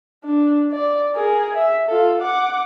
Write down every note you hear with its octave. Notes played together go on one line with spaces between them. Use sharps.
D4
D5
G#4 A#4
E5
F4 A4
F#5 D6